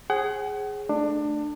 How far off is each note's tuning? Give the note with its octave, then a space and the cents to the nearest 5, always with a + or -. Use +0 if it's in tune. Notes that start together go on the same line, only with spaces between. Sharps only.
G#4 +0 C5 +45 F#5 +35
A3 +0 D4 +20